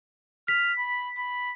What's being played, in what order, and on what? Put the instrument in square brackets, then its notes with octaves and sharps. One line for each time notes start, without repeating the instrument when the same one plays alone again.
[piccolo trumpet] F6 [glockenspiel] B6
[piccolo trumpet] B5
B5